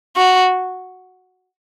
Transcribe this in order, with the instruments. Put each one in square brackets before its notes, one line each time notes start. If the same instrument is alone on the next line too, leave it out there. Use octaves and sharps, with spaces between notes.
[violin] F#4